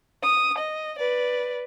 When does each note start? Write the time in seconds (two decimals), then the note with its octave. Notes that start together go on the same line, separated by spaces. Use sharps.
0.23 D#6
0.58 D#5
0.99 B4 D5